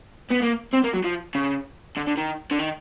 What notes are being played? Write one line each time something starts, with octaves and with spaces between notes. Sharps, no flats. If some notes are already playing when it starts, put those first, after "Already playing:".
B3
A#3
C4
A#3
F#3
F3
C#3
D3
D3
D#3
D3
D#3